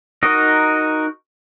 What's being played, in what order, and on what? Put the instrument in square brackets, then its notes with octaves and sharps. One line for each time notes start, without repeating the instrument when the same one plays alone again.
[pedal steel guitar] D#4 F#4 A#4 D#5